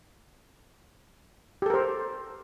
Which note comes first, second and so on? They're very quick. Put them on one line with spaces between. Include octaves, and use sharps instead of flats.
G4 A4 A#4 C5